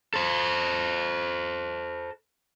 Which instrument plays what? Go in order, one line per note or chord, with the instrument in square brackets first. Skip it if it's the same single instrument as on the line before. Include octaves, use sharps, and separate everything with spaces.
[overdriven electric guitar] A4 C5